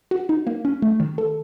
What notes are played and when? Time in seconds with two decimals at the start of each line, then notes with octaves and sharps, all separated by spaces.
0.11 F#4
0.29 D#4
0.47 A#3
0.65 C#4
0.82 A3
1.00 D#3
1.18 A4